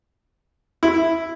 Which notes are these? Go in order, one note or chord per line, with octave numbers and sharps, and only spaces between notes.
E4